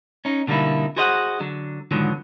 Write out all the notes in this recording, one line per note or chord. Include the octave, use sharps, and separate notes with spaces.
C#4 D#4
B2 D3 G3 A#3 D#4 E4
F#4 G#4 C5 D#5 F5 F#5
D3 F#3
G#2 B2 D3 D#3 F3 F#3